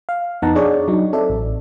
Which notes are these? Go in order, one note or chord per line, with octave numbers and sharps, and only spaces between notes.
F5
F2 B3 D#4 F#5 A5 A#5
D4 G#4 C#5 D5
F#3 D#4
C4 A4 D5 E5
A1